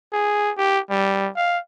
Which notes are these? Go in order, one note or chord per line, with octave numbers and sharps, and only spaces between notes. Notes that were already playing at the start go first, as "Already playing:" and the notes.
G#4
G4
G3
F5